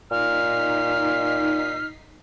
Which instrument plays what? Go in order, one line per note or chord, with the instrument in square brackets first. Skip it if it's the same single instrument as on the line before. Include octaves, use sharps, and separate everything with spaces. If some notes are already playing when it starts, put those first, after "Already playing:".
[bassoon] A#2 [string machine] D#4 B6 C7 [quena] F6